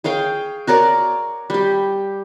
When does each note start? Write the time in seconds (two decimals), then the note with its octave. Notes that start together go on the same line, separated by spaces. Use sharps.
0.04 G#4 C#5 F5 G5
0.67 F#4 A#4 C#5 D5
1.50 G3 G4